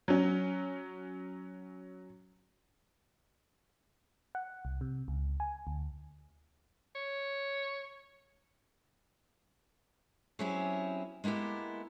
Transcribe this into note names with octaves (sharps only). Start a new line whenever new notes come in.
F#3 C#4
F#5
C2
C3
C#2
G#5
D2
C#5
F#3 C4 C#4 E4 G4 G#4
G#3 A#3 B3 E4 G4